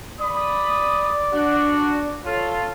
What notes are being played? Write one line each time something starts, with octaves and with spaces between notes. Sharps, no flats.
D5 B5 D#6
D4 F#4
F4 A4 C#5